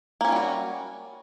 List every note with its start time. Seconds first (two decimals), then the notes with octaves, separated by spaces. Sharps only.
0.21 A#3
0.25 C#4
0.28 F4
0.32 G3
0.36 F#4